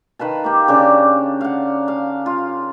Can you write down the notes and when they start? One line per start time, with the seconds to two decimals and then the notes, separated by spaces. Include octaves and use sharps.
0.19 D#3 B4 F5 A5
0.44 A#3 G4
0.68 C#3 D4 D6
1.41 F5 F#5
1.88 F5
2.26 F4